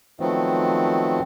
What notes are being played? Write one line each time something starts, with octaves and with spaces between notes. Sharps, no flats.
D#3 F3 F#3 A3 B3 C4